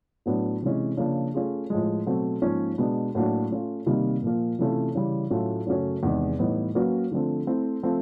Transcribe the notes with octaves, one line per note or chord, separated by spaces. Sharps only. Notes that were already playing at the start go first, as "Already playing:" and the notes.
A2 F#3 B3 D4
C3 E3 G#3 C#4
C#3 F3 A#3 D4
A3 C#4 F4 G#4
A2 F3 G#3
B2 F#3 A3 C4
G#2 F3 A#3 C#4
B2 G#3 B3 D4
A2 F#3 A#3 D4 F#4
A3 C#4 F4
C3 D#3 G3 A#3
A#2 F3 A#3
C3 E3 A3 C#4 F4
C#3 E3 G3
A2 F#3 A3 C#4 F4
F#2 C#3 F#3 A3 C#4
E2 C3 D#3 G#3
A2 E3 G3 B3 D#4
F#3 A#3 C#4 F#4 B4
D3 F3 A3 C4
A3 C4 E4
F3 A3 C4 F4 A4